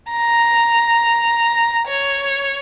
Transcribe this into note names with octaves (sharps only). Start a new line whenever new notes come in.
A#5
C#5